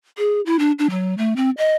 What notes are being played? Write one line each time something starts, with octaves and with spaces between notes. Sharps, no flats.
G#4
E4
D4
D4
F#3
A3
C4
D#5